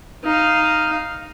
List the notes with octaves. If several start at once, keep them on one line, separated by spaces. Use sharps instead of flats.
D#4 F5